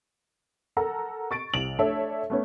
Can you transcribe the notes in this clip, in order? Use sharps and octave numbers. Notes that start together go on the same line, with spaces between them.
A4 A#4 F#5 A#5
C#6 A6 D7
C2 D7 F7 F#7
A3 D4 A4 C#5 D5 E5
A3 B3 C#4